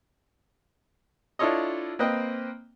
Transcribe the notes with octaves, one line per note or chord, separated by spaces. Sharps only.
D4 E4 F4 A4 C#5 D#5
A#3 C4 B4 D#5 G5